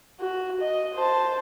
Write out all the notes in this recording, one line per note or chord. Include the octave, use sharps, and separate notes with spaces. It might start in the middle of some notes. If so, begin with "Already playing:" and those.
F#4
D#5
C5 A5